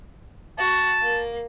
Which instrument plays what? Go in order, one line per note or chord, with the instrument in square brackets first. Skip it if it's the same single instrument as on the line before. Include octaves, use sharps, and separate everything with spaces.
[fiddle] F#4 [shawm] A5
[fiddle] A#3